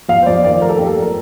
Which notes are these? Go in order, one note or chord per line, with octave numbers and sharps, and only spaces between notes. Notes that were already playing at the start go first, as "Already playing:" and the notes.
F2 F5
C5
F2 D5
D#3 D5
A3 A#4
A4
F2 G4
A4
F2
A#4